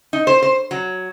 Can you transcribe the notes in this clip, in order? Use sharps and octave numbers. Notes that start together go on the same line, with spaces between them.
D#4
C5
C5
F#3